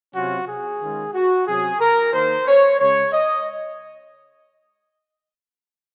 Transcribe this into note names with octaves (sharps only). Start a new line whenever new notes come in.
C3 F#3 C#4 F4 F#4
G#4
D#3 G#3 C#4 F4
F#4
C3 F#3 C#4 G#4
A#4
D#3 A#3 D#4 C5
C#5
C#3 G#3 C#4 C#5
D#5